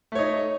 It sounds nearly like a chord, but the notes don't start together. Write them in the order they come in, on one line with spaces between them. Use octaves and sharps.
A3 C#5 D#4